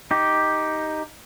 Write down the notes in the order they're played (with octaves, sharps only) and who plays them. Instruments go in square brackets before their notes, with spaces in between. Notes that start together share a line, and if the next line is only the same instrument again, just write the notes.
[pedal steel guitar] D#4 G4